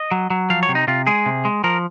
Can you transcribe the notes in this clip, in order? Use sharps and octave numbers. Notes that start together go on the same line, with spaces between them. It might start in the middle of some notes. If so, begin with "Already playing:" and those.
Already playing: D#5
F#3
F#3
F3 F5
C#5
C3
D#4
C3 F4
G#3 G#4
C3
G#3
F3 A#4